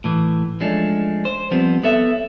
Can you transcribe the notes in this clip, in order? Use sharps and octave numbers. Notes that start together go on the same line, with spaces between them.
A2 E3
F3 G#3 A3 C#4 D4
C5
F3 G3 B3 C4
B3 A4 C#5 E5